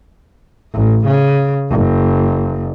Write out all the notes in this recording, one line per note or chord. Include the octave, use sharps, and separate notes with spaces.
A1
C#3
F#1